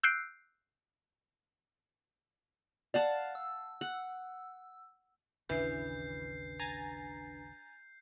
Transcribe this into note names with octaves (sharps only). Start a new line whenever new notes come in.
E6 F#6 G6 C7 D7
D5 F5 F#5 A5
E6
F#5
A1 D#2 C#3 E3 D4 B4 G6 C7
G#5 A#5 A6